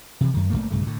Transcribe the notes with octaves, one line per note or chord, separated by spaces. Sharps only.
C3 E3
F#2 D#3
G1 G2 A3 A#3
B1 G2 C#3 A3
A2 D3